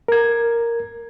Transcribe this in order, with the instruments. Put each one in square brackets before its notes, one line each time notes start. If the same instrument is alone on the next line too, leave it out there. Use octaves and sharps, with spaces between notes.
[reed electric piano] A#4 G#6